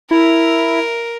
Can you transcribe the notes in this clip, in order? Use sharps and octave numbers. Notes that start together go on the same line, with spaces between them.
E4 A#4